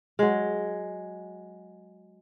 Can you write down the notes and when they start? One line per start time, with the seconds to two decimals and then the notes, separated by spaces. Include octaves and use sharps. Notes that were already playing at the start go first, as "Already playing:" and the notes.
0.19 F#3 G#3